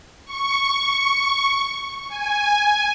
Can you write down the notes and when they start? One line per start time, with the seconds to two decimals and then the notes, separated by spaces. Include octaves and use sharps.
0.25 C#6
2.08 G#5